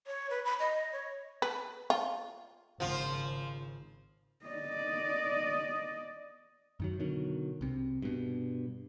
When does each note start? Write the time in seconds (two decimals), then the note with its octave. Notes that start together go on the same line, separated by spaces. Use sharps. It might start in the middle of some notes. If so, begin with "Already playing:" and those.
0.07 C#5
0.30 B4
0.45 B5
0.60 D#5
0.92 C#5
1.42 B4
1.90 F4
2.80 G#1 C#3 F3 F4
4.46 D5 D#5
6.80 F#2 D#3 F#3
6.99 B2 D3 D#3 F#3
7.61 C2 C3
8.02 G2 B2